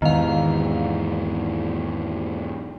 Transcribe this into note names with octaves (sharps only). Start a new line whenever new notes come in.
E2 G#2 D#3 F5